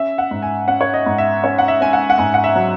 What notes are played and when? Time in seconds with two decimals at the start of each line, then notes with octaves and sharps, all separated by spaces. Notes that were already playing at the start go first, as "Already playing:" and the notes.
Already playing: C#4 E5
0.18 F#5
0.31 G#2
0.42 G#5
0.67 C#4 F#5
0.81 C#5
0.94 D#5
1.06 G#2
1.18 E5
1.44 C#4 C#5
1.58 F#5
1.68 E5
1.81 C#4 G#5
1.93 F#5
2.10 F#5
2.18 G#2 G#5
2.34 F#5
2.44 E5
2.55 F#3